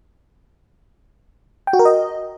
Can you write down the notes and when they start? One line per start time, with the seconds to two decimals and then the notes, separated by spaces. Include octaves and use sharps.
1.67 G5
1.73 F#4
1.79 A#4
1.85 D#5